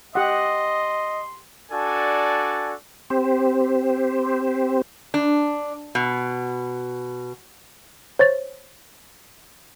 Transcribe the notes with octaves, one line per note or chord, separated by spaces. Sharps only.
G4 D#5 F#5 C6
D4 F#4 A4 D5 G#5 A5
C4 G4 C5
D4
B2
C5 C#5 A6